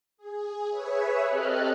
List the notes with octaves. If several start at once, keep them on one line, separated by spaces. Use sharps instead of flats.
G#4
G#4 B4 C#5 E5
C4 G4 A4 D#5 F6 F#6